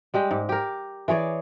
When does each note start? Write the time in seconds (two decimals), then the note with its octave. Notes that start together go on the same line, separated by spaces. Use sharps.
0.14 G3 G#3 G4
0.31 G#2
0.49 G4 A#4
1.08 E3 G#4 C#5 D5